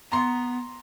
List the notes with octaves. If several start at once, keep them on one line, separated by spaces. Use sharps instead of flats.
B3 A#5 C6